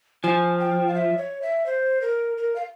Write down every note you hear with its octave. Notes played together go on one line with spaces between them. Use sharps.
F3 G#5
G5
F5
E5
C#5
E5
C5
A#4
A#4
F5